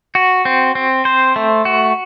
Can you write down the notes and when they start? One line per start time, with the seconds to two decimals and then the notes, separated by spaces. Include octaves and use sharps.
0.15 F#4
0.45 C4
0.75 C4
1.05 C5
1.36 A3
1.65 F#4